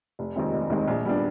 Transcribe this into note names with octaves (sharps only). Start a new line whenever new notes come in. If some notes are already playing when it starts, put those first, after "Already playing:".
F1
D#2 D#3 G#3 C4
F1
D#2 D#3 G#3 C4
A#1
A#2 G3 B3 D4